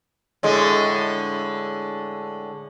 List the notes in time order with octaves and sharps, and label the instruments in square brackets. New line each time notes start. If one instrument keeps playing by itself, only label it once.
[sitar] A2 D3 G#3